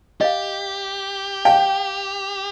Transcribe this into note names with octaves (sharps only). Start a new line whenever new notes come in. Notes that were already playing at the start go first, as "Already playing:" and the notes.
G4 D#5 F5
F5 G5 A5